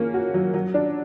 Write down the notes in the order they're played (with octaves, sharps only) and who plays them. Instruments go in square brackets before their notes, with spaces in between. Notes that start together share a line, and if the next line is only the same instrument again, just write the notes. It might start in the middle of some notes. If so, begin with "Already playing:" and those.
Already playing: [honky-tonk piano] A#3 C#4
F#4
F#3
F#3
D4